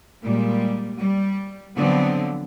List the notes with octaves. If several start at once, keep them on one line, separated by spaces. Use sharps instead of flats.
A#2 G3 G#3
G3
D3 F3 F#3 B3 C4